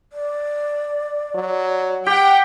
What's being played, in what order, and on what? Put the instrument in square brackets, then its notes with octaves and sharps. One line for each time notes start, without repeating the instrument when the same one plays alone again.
[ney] D5
[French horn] F#3
[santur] G4 [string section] F#5 G5